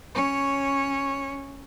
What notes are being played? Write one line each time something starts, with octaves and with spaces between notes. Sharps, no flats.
C#4 C#5